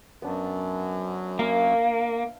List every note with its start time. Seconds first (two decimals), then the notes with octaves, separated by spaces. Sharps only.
0.22 F#2 B3 D4
1.39 A#3 E5 F5